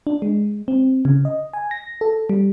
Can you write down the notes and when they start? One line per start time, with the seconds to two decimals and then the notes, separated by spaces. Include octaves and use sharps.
0.07 D4
0.22 G#3
0.68 C4
1.05 C#3
1.25 D#5
1.53 G#5
1.71 A#6
2.01 A4
2.30 G3